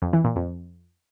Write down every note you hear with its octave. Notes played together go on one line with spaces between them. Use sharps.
F2
E3
A#2
F2